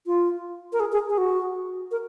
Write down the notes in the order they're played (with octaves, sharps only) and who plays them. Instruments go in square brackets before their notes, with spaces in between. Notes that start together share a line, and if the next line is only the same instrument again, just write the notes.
[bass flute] F4
A#4
G#4
G#4
G#4
F#4
A#4